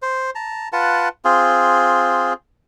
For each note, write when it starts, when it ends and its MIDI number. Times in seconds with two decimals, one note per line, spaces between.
0.02 0.30 72
0.35 0.68 81
0.35 0.68 82
0.73 1.09 65
0.73 1.09 71
0.73 1.09 78
0.73 1.09 81
1.25 2.33 60
1.25 2.33 65
1.25 2.33 68